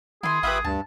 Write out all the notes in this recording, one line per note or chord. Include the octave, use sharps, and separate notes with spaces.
D#3 E4 G#4 C6
A1 F4 G4 B4 E5 B5 D#6
D2 G2 A5